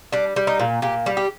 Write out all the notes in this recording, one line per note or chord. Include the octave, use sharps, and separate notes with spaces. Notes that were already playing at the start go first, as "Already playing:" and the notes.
G3 D4
G3
D#4
A#2
A#2 G4
G3
G4